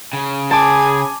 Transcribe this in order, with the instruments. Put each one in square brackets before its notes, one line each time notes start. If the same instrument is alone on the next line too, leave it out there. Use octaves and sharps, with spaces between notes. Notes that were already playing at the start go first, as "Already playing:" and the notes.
[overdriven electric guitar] C#3
[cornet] G#4 [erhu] G#5 [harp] A5 D6